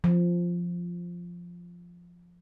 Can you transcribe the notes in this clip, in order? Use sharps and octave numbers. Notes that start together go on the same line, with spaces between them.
F3